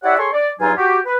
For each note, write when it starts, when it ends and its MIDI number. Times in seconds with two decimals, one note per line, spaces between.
0.04 0.14 64
0.04 0.14 67
0.04 0.14 73
0.04 0.14 74
0.04 0.14 76
0.04 0.14 78
0.18 0.30 68
0.18 0.30 69
0.18 0.30 73
0.18 0.30 84
0.18 0.30 85
0.33 0.49 74
0.60 0.72 40
0.60 0.72 43
0.60 0.72 54
0.60 0.72 63
0.60 0.72 65
0.60 0.72 80
0.77 0.99 66
0.77 0.99 67
1.06 1.18 71